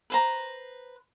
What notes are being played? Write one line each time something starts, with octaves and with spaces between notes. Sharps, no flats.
B4 C5 A#5